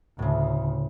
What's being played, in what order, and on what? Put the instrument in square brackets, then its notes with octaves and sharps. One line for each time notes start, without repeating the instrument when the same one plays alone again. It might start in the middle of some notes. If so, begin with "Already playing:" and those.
[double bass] D2 [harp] A2 C#3